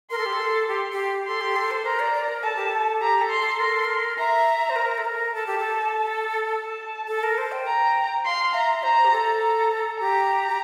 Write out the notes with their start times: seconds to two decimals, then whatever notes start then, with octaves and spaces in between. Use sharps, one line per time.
0.11 A#4 C6
0.18 A4
0.26 G4
0.33 A4
0.68 G4 C6
0.92 G4
1.27 A4 C6
1.41 G4
1.56 A4
1.71 C5
1.85 A#4 A#5
2.00 D5
2.14 D5
2.29 A#4
2.43 A4 A5
2.56 G4
2.68 A4
3.01 G4 A#5
3.21 A4
3.30 C6
3.41 A4
3.59 A#4 C6
3.73 A4
3.85 A#4
4.18 E5 A#5
4.70 C5
4.76 A#4
4.98 A4
5.05 A#4
5.34 A4 A5
5.47 G4
5.58 A4
6.51 A5
7.08 A4
7.23 A#4
7.38 C5
7.52 G5
7.67 A#5
8.25 F5 C6
8.54 E5 A#5
8.83 C5 A#5
9.05 G4
9.12 A4
9.41 A#5
9.99 G4 A#5
10.48 G4